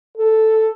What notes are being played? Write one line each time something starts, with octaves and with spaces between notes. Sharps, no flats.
A4